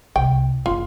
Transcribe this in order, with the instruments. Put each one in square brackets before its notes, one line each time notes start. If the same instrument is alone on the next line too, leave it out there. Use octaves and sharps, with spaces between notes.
[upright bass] C2 [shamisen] G5
[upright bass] F#1 [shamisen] F4